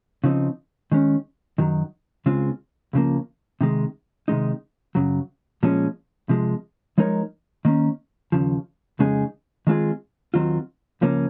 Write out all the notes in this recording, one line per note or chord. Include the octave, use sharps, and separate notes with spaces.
C#3 F3 C4 D#4
D#3 G#3 C#4
F#2 D#3 F#3
C#2 C#3 G#3 C4 F4
C#2 C#3 F3 A#3
C3 D#3 G#3
C3 D#3 G#3 D#4
F#2 C#3 F#3
A#2 F3 G#3 C#4
C3 F3 G#3
F3 G#3 D#4 A#4 C#5
D#3 A#3 C#4
D#2 C#3 F3
F2 C#3 G#3 D#4 G#4
D#3 G#3 C4 F4 G#4
D#2 D#3 F#3 C4 F4
C#2 C#3 F3 A#3 C#4